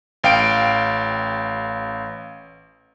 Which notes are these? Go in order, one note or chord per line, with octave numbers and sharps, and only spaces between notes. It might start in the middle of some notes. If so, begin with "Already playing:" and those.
A1 F5 G5 D7